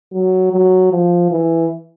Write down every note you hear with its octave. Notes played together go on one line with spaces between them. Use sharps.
F#3
F#3
F3
E3